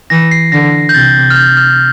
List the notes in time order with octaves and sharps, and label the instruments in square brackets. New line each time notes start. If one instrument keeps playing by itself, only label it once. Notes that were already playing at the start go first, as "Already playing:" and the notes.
[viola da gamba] E3 [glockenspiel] A#6
[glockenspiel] C7
[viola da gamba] D3 [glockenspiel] A#6
[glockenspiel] G6
[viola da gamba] C3 [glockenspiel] A6
[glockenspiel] F6
G6
F6